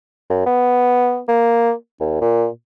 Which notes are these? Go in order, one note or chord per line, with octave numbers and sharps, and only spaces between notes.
F#2
B3
A#3
D#2
A#2